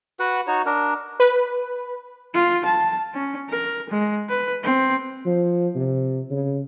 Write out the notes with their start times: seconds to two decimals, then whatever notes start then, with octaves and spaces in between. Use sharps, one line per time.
0.20 F#4 B4 F#5
0.47 D#4 F#4 C#5
0.66 D4 A#4
1.20 B4
2.34 F4
2.65 A5
3.14 C#4
3.50 A#4
3.90 G#3
4.29 B4
4.63 C4
5.26 F3
5.75 C3
6.31 C#3